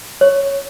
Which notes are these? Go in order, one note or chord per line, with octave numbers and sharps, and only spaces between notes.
C#5